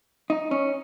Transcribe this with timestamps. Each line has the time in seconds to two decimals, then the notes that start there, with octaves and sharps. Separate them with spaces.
0.30 D#4
0.51 C#4